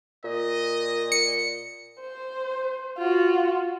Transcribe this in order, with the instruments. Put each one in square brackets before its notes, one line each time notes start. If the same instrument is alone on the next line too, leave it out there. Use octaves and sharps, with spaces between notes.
[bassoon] A#2 [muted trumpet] D#5
[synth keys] C#7
[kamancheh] C5
F4 F#4